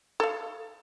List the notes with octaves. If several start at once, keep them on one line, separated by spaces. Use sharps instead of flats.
A4 F5